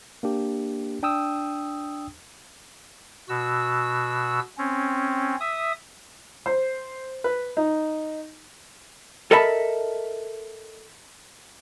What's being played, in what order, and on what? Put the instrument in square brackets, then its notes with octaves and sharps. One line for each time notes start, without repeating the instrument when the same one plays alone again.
[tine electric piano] A#3 D4 G4
D4 G5 D#6 E6
[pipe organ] B2 F#4 E6
C4 C#4
E5 D#6
[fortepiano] C5
B4
D#4
[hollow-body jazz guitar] A4 A#4 D#5 E5 A5 B5